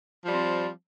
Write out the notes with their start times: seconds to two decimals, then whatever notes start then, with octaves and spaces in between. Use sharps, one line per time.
0.24 F3
0.28 G3
0.32 C4